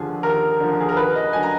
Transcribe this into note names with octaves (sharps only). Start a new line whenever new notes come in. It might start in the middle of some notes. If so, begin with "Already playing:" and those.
Already playing: D#2 D3 F3 G#4
D#2 A#4
D3 F3
G#4
A#4
D#2 B4
D#5
D3 F#3 G#5
A#5